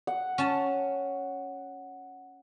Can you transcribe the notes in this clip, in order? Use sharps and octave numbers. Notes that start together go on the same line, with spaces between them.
F#5
C#4 A5